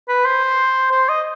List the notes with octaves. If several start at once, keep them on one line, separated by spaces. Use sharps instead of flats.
B4
C5
C5
D#5